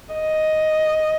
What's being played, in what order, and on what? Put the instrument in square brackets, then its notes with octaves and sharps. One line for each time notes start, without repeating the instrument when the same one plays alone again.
[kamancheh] D#5